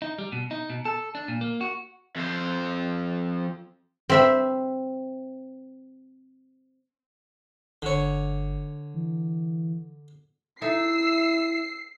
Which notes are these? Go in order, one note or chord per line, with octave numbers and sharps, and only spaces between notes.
D#4
G3
B2
D#4
B2
A4
D4
A#2
A#3
F#4
F2 C5
C4 E5 B5
G1 D3 C#5
E3
D#4 E4 A4 E5 E6 C7